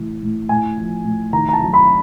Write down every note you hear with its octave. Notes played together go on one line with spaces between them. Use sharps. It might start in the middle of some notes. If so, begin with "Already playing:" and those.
Already playing: A2 E3
A2
A2 G#5
F3
A2
D#3 A#5
A#5
A5
F#3
B5